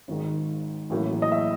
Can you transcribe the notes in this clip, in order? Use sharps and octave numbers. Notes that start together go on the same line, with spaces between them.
G#1 G#2 D#3
A1 A2 F#3 A#3
D#5
E5